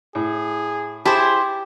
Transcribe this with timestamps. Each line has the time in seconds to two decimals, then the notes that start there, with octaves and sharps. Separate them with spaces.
0.15 A2 G#4
1.06 E4 G4 G#4 C5 A5